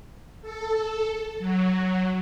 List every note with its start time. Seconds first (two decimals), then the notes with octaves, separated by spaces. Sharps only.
0.42 A4
1.39 F#3